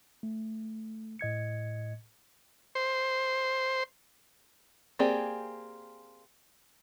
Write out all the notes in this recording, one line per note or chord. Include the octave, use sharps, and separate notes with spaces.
A3
A2 D#5 G#6 C#7
C5
A#3 C4 G4 G#4 D5